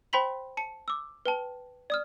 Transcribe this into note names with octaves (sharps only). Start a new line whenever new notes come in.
C5 G5 B5 C6 B6 F#7
A5 C#7
D6 E6
B4 G5 A5
D5 D#6 F6